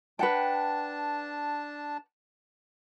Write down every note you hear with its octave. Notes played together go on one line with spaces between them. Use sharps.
D4 B4 F#5 G5 A5